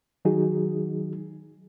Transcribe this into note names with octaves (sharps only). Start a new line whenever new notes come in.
D#3 F#3 D#4 F#4 G#4